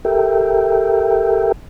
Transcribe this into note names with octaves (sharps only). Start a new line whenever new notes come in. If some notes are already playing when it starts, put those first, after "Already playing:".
G4 A4 A#4 E5 G5